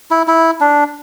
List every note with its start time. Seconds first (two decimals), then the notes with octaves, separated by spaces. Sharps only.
0.11 E4
0.27 E4
0.60 D4